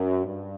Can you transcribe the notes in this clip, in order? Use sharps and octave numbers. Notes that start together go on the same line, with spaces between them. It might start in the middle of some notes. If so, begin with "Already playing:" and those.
Already playing: F#2
G2